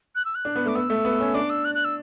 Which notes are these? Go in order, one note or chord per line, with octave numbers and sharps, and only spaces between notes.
F#6
E6
F#6
D4
B3
A3
D6
B3 E6
A3
B3
C#4
D4 D6
E6
F#6
F#6
E6